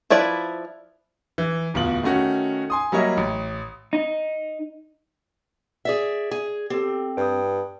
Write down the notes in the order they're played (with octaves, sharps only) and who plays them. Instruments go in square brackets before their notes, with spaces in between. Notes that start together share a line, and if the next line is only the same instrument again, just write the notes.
[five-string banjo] F3 E4 B4 D5
[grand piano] E3
D1 E2 F4 F#7
D#3 A3 C#4 F#4
G#5 C6 D#6
F#3 G3 A#3 C#5 D#5 E5
A1
[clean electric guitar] D#4
[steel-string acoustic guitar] G#4 D5 E5
G#4
[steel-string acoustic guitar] C4 [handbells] G4 A4
[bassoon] G2 [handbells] G5 D#6